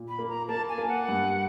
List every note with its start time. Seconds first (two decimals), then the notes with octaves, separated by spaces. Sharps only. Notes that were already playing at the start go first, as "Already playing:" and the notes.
Already playing: A#2
0.09 B5
0.19 A#3
0.29 A#5
0.48 A#3 A5
0.69 G#5
0.78 A#3
0.88 F#5
1.09 G2